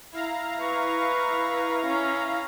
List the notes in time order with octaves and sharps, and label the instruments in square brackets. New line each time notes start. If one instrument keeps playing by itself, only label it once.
[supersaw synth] E4 F5 A#5
[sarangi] B4 [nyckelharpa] C#6
[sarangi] C#4